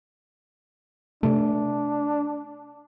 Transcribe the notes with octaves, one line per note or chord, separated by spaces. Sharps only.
C3 A3 D4